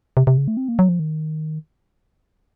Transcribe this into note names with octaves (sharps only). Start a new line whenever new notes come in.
C3
C3
C#3
A3
C4
A#3
F#3
F3
D#3